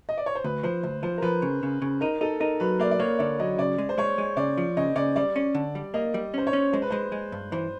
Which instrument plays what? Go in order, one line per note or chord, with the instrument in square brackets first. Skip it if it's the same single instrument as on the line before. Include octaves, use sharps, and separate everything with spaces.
[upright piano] D#5
D5
C#5
C5
[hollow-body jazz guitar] D2 [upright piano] B4
[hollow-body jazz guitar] F3 [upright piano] C5
[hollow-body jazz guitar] D2 [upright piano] C5
[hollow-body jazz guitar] F3 [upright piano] C5
[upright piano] A#4
[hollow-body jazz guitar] F3 [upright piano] B4
[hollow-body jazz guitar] C#3
C#3
C#3
[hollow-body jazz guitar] D#4 [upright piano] A#4
[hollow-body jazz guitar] D#4 [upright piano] A4
[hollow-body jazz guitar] D#4 [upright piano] A#4
[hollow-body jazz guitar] F#3 [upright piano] B4
[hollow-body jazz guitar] A#3 [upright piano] D5
[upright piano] D5
[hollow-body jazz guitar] A#3 [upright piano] C#5
[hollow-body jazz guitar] D3 [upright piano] D5
[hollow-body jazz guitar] F#3 [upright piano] D#5
[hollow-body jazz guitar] C#3 [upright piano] D5
[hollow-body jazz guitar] G#3
[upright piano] C5
[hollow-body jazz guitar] G#3 [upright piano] C#5
[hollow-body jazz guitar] G#3
[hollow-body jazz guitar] C#3 [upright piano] D5
[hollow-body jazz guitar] F3
[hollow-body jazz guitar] C#3 [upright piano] D#5
[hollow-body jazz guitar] C#3 [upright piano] D5
[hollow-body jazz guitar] G3 [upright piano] D5
[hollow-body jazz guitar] C#4
D3
G3
[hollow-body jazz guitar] A#3 [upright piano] D#5
[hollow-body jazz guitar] G3
[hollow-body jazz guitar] C#4 [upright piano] C5
[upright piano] C#5
[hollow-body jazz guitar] C#4
[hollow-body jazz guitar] G#3 [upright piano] C5
[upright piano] B4
[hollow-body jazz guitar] G#3 [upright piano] C5
[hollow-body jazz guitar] G#3
G2
[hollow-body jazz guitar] E3 [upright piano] C5